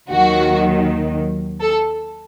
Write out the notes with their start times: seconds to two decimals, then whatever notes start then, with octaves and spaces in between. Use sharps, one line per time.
0.11 D#2 D#3 F#3 F#4
1.61 A4